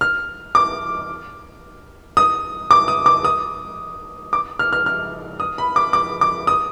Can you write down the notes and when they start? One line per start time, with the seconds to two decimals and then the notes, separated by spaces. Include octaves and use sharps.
0.01 F6
0.55 D6
2.17 D#6
2.71 D6
2.88 D#6
3.06 D6
3.25 D#6
4.33 D6
4.59 F6
4.73 F6
4.86 F6
5.40 D#6
5.58 B5
5.76 D6
5.93 D6
6.21 D6
6.47 D#6